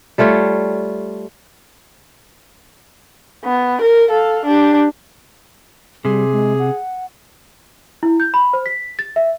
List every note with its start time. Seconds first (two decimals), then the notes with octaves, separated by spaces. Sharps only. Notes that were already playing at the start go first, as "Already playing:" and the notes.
0.18 G3 A3 F4 C#5
3.45 B3
3.81 A#4
4.10 A4 F5
4.45 D4 G4
6.05 C3 G3 G#4
6.32 G#3
6.59 F#5
8.03 E4
8.20 G6
8.34 B5
8.53 C5
8.66 B6
8.99 A6
9.16 E5